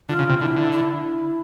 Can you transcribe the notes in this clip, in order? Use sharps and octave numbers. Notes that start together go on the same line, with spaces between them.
D3 F4
C#3
C3
D3 E4
D3
E4